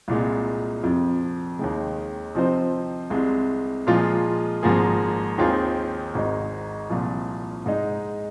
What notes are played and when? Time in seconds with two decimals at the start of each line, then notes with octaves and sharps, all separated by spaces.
0.08 C2 A#2 G#3
0.83 F2 C3 F3
1.59 D#2 D#3 G#3
2.35 C3 F3 C4 D#4 C5
3.10 C2 C3 G#3
3.87 A#2 F3 G#3 F4 G#4
4.63 G#1 G#2 F3 A#3 G#4
5.38 D#2 D#3 C4 F4 G#4
6.14 G#1 G#2 G#3 D#4
6.90 C2 A#2 F3
7.66 G#2 G#3 D#4